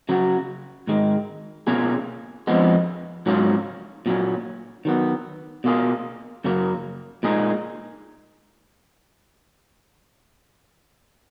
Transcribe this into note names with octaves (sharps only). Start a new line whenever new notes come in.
C#3 F#3 C#4 F#4
G#2 D#3 G#3
B2 A#3 C#4 F4 G#4
F2 F3 G#3 B3
G#2 F#3 C#4 F4
A#2 F#3 C#4
D#3 F#3 B3
B2 A#3 F4 G#4
F#2 C#3 F#3 A#3
A#2 G#3 D#4 G#4